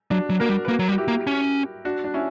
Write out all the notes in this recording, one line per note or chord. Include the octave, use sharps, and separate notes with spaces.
F#3 D4 F#4
F#3
A#3 F#4 A#4
G3
B4
A#3 F#4 A#4
F#3
G3
F#4
E4 G4
A#3
C#4
D4 F#4
D4
C#4 E4